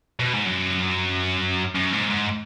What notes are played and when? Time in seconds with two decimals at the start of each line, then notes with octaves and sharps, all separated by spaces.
0.20 B2
0.34 G#2
0.45 F#2
1.75 F#2
1.93 G#2
2.10 G#2